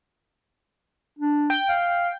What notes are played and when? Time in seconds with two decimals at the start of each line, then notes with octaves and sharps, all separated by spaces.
1.19 D4
1.50 G5
1.69 F5